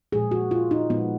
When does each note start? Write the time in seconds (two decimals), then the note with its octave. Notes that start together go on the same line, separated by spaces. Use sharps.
0.12 A#2 F3 G#3 G#4
0.31 F#4
0.51 F4
0.71 D#4
0.90 A#2 F3 G#3 B3